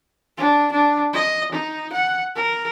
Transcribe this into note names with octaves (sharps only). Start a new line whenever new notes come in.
D4
D4
D#5
D#4
F#5
A#4